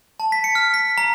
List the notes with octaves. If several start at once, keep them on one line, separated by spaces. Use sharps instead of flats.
A5
B6
C#7
F6
B6
A#5